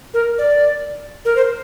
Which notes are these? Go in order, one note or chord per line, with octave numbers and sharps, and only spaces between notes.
A#4
D5
A#4
C5